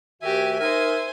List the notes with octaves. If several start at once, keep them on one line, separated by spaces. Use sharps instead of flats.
D2 D#3 F#4 G4 E5 G#5
D#4 A#4 C5 G#5